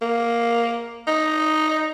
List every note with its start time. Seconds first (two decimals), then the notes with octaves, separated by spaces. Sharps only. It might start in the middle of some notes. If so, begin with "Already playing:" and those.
0.02 A#3
1.07 D#4